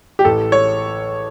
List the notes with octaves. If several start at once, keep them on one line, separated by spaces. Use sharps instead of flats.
G4
A1 A4
C#5